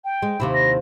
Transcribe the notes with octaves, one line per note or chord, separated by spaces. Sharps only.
G5
G#3
D#2 C3 E4
A#6